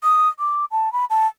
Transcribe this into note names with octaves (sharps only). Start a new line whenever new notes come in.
D#6
D6
A5
B5
A5